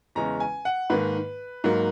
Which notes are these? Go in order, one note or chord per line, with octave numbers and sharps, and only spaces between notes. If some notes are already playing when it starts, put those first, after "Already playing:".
E2 C#3 G#3 C#4 A#5
G#5
F#5
G#2 D#3 A#3 B4
G#2 F#3 A#3